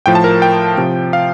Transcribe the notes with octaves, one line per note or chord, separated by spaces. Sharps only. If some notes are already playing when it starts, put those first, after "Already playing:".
A2 F3 G5
A5
A#4
G5
C3 F3
F5